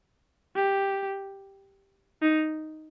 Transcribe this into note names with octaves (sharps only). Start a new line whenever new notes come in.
G4
D#4